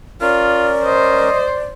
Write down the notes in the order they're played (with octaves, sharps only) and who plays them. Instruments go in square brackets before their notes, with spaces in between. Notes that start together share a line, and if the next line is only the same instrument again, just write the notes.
[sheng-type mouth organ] C#4 A#4 [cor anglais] F4 [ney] D5
[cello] C5 [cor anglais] D#5